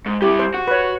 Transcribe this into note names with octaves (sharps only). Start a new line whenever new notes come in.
G#2
G3 E4 G4
C5
F#4
B4 C#5